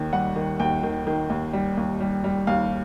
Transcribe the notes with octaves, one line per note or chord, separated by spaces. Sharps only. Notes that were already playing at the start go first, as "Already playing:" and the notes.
Already playing: D#2 D#3
G3 F#5
D#3
D#2 G5
D#3
D#3
D#2
G3
D#2
G3
G3
D#2 F5